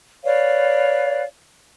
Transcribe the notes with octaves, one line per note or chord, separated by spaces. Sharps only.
B4 C#5 D5 F5